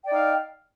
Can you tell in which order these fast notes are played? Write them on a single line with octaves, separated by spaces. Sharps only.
G5 D5 D#4 F5